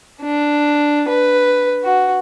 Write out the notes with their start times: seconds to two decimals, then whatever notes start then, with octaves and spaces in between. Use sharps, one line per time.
0.23 D4
1.08 B4
1.83 F#4